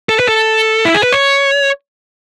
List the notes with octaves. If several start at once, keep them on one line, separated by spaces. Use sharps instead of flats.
A4
B4
A4
E4
G#4
B4
C#5